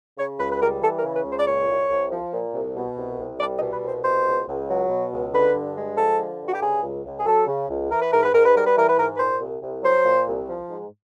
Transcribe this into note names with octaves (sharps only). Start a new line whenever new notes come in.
C#3 C#5
C#2 B4
B4
G3 A#4
E3 A4
A#4
C#3
B4
C#2
C5
D5
A#2 C#5
C2
C2
F3
A#2
C2
B2
C2
C2
G3 D5
D#5
B2
B4
C2
C5
B2 C5
C#2
C#2
F#3
B2
C#2
D3 B4
G2
G#3
F3 A4
D3
G2
F#4
G4
C#3 G#4
C#2
C#2
G#4
F#3 A4
C#3
C#2
E3 A#4
B4
G#2 A#4
B4
G#2 A#4
B4
G3 A#4
B4
E3 A#4
B4
G#2 A#4
B4
A#2 C5
C2
C2
F#3 C5
A#2
C2
F3
G#2